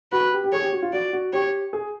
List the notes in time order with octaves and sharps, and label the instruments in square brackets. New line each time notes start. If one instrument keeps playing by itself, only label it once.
[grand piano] F#4 [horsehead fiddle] B4
[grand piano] G4
G4
[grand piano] G#4 [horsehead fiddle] C#5
[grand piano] G4
F#4
F4
[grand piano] F#4 [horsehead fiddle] D5
[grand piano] F#4
[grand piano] G4 [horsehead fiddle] C#5
[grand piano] G#4